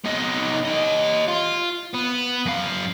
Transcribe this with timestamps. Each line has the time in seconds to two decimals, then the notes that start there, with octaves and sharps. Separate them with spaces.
0.05 B3 D#4
0.65 G4 D#5
1.28 F4
1.94 B3
2.46 F#2 F5